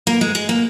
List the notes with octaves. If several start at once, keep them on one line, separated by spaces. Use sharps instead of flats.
A#3
G#3
G#3
A#3